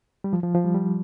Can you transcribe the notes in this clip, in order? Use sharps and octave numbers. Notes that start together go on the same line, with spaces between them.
G3
F3
F3
F3
G3
G3